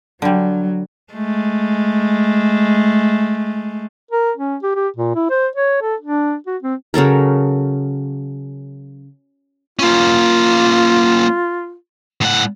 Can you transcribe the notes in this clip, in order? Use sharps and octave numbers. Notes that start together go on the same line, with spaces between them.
D3 F#3 G3
G#3 A3
A#4
C#4
G4
G4
A#2
E4
C5
C#5
A4
D4
F#4
C4
C#3 F#3 A4 A#4
A#3 C#4 F4
A2 F#5